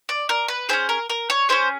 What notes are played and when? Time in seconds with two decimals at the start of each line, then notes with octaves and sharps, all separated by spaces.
0.09 D5
0.29 A#4
0.48 B4
0.69 C#4 E4 G#4 C5
0.89 A#4
1.10 A#4
1.30 C#5
1.49 C#4 E4 G#4 C5